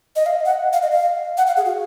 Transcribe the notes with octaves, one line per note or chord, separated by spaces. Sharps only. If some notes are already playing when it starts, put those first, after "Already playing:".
D#5
F5
F#5
F5
D#5
F5
F#5
F5
G#4
F#4